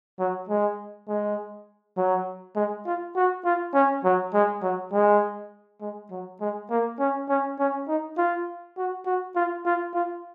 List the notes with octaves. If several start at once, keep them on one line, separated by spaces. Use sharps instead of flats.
F#3
G#3
G#3
F#3
G#3
F4
F#4
F4
C#4
F#3
G#3
F#3
G#3
G#3
F#3
G#3
A#3
C#4
C#4
C#4
D#4
F4
F#4
F#4
F4
F4
F4